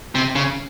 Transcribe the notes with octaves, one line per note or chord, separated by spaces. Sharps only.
C3
C#3